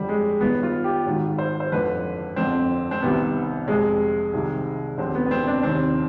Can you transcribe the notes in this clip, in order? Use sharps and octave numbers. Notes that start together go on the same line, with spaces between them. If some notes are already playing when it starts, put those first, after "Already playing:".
Already playing: G1 F2 D3 G3
G#3
G1 G2 D#3 B3
F4
G4
G#1 G#2 D#3
C5
C5
G1 F2 D3 B4
G1 F2 D3 C4
C4
C2 C3 D#3 B3
F1 F2 C3 G#3
C2 C3 D#3
F1 D#2 D3 C4
B3
B3
C4
D4
F1 D#2 D#3 C4